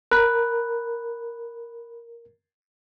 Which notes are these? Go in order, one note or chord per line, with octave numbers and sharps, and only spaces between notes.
A#4 B5 F#6